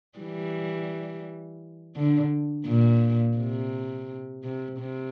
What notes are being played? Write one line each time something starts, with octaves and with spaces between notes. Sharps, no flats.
E3 G3
D3
A#2
C3
C3
C3